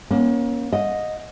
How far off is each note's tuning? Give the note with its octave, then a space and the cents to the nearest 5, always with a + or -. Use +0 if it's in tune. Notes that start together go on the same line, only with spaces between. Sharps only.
A#3 +35 C#4 +0
D#5 +0 F#5 -30